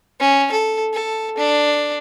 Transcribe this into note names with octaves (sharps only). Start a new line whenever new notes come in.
C#4
A4
A4
D4